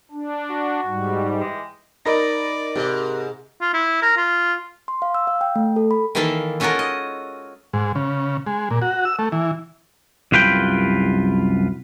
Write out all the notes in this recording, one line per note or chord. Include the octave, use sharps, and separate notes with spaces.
D4
F#4
G#2 G3
E3 G#3 G4
D#4 A#4 D5 D#5 B5 A#6
G#2 C3
F4
E4
A#4
F4
C6
F5
E6
F5
G5
A3
A4
B5
D#3 E3 A#3 A4 E5 F5
G#3 C#4 F4 F#4 A4 A#4
D#5
G#2
C#3
G#3
A#2
F#4
E6
A3
E3
C2 F#2 F4 B4 G5